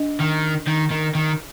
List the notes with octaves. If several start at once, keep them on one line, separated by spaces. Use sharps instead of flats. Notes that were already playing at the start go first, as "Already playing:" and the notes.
Already playing: D4 D#5
D#3
D#3
D#3
D#3